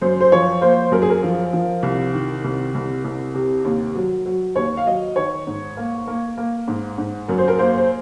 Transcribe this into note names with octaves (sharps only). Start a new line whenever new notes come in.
F#2 C5
C5
F3 C#5
A#3 C5
F#2 A#4
G#4
A#4
F3
F3
C2
D#3
C2
C2
C2
C3
D#2
F#3
F#3
D#2 C#5
F5
F#3 D#5
D#3 C#5
G#2
A#3
A#3
A#3
G#2
G#2
F#2 A#4
C5
A#4
A#3 C5
C5